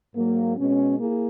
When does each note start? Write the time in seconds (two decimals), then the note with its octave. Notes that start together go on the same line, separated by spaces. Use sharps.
0.14 G#2 F#3 A#3
0.57 B2 G#3 C#4
0.99 A#3 E4 G#4